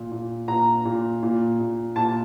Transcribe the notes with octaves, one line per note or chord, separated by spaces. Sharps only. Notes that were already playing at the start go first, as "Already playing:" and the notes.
Already playing: A#2
A#2
A#2 A#5
A#2
A#2
A#2
A#2 A5